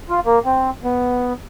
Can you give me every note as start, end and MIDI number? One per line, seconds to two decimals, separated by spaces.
0.10 0.20 65
0.26 0.39 58
0.45 0.70 60
0.84 1.33 59